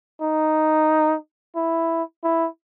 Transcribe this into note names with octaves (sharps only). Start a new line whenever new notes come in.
D#4
E4
E4